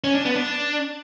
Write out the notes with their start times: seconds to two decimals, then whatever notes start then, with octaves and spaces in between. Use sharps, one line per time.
0.04 C#4
0.15 D4
0.25 B3
0.36 D4